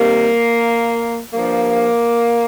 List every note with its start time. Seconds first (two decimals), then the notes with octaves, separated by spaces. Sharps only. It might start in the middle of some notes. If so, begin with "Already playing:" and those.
Already playing: C3 D#3 G3 A#3
1.32 G2 F3 A#3